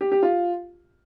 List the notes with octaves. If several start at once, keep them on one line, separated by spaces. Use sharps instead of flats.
G4
G4
F4